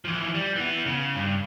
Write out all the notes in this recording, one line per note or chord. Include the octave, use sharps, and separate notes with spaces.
E3 F3
G3
E3 B3
C#3
G2